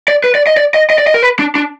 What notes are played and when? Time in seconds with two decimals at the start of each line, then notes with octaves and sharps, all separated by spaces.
0.08 D5
0.24 B4
0.35 D5
0.47 D#5
0.57 D5
0.74 D#5
0.90 D#5
0.98 D5
1.07 D#5
1.14 A#4
1.22 B4
1.39 D4
1.55 D4